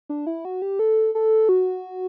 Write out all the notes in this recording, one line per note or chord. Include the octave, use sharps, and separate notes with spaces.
D4
E4
F#4
G4
A4
A4
F#4